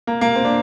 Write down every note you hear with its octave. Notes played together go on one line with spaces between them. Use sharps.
A#3
A#3
C4
D4